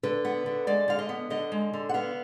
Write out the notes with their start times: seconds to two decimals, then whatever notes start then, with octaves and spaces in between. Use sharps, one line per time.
0.03 D3 B4
0.25 B3
0.46 D3
0.67 G#3 D5
0.88 D3 F5
0.99 D#5
1.09 B3
1.30 D3 D#5
1.52 G#3
1.73 D3
1.89 F#5
1.94 B3 F5